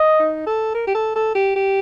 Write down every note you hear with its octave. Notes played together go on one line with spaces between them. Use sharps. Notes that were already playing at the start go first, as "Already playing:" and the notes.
Already playing: D#5
D#4
A4
A#4
G4
A4
A4
G4
G4